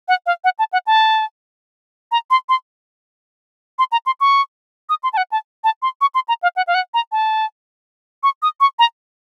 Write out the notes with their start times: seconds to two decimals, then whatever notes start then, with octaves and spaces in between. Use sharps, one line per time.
0.08 F#5
0.26 F5
0.44 F#5
0.59 A5
0.73 F#5
0.87 A5
2.12 A#5
2.30 C6
2.49 C6
3.79 C6
3.92 A#5
4.06 C6
4.20 C#6
4.89 D#6
5.03 C6
5.13 A5
5.17 F#5
5.32 A5
5.64 A5
5.82 C6
6.01 C#6
6.15 C6
6.28 A#5
6.43 F5
6.56 F#5
6.67 F5
6.74 F#5
6.94 A#5
7.12 A5
8.23 C#6
8.42 D#6
8.60 C#6
8.79 A#5